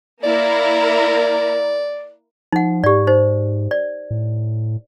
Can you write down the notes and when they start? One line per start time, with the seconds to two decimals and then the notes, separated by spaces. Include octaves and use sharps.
0.24 A#3 E4 A#4 D5
2.52 F3 D#4 F#5
2.84 G#2 G4 D5
3.07 D#4 C5
3.71 D5
4.11 A2